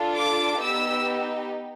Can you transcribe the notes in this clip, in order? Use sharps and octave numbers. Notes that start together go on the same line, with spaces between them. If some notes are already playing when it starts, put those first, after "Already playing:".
Already playing: D4 F4 A4
D6
B3 D#4 G4 E6